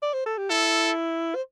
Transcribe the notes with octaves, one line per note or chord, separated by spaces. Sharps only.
D5
C5
A4
G4
E4 A4
C5